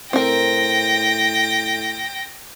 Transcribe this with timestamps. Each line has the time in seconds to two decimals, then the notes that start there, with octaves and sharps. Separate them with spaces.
0.13 A2 C4 A#4 G5 A#6